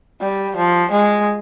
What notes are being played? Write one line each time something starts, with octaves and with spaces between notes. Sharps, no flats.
G3
F3
G#3